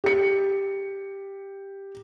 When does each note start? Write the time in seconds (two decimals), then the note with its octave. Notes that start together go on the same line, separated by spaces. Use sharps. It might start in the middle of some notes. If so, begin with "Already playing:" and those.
0.04 G4 C#7